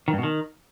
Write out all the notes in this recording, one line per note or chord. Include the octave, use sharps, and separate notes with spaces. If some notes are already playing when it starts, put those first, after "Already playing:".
D#3
G2
B2
D#3